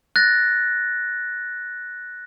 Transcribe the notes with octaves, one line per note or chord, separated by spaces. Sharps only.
F#6 A6 A#6